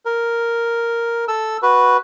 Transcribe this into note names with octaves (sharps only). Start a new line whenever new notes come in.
A#4
A4 E6
F#4 B4